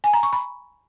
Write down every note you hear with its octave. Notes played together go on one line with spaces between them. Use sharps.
G#5
A#5
C#6
B5